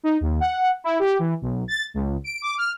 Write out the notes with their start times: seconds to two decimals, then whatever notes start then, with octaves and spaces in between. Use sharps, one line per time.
0.03 D#4
0.21 D#2
0.40 F#5
0.84 E4
0.99 G4
1.19 E3
1.41 B1
1.68 A6
1.94 C#2
2.24 D7
2.42 D6
2.58 F6